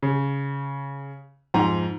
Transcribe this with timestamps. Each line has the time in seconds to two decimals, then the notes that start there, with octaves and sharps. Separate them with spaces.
0.03 C#3
1.54 F2 G#2 A#5